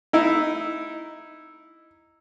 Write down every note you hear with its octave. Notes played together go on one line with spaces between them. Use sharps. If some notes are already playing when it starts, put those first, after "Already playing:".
D#4 E4